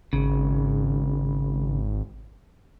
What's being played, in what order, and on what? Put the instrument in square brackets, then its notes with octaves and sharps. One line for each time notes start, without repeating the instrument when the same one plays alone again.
[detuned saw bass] G#1 [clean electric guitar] C#3